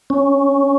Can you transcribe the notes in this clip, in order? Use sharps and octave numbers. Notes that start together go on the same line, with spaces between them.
C#4